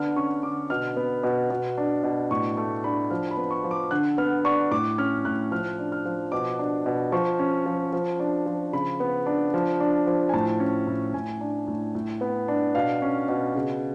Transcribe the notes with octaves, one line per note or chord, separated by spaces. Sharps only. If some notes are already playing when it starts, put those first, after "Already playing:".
Already playing: D3 B3 D4 F6
C#4 C#6
D3 D6
B2 F6
B3
B2
B2
D4
B2
A2 C#6
A3 C#6
D4 B5
F3 F6
B5
B3
C#6
F3
D6
D3 F#6
B3 F6
D4 C#6
A2 D6
C#4 F6
A2 F#6
F3 F6
D4
F6
F3
B2 D6
D4
B2
F3 C#6
C#4
F3
F3
D4
F3
C#3 B5
B3
D4
F3
D4
F3
G#5
A2 A5
C#4
A2
A2 G#5
D4
A2
A2
B3
D4
B2 F5
C#4
B2
C#3